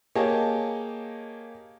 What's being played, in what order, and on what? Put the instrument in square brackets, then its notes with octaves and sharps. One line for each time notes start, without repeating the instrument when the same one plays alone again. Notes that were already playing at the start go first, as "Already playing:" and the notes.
[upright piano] A#3 G4 G#4 C#5 D#5 A5